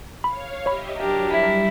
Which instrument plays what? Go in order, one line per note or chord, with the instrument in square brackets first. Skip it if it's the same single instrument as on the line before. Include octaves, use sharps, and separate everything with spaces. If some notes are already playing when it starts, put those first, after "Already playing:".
[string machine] C#5 F5 [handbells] B5
[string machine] G4 D#5 E5 [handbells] C#5 B5
[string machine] F#3 [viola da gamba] D4 G4 A#4
[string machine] G3 [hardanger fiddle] E4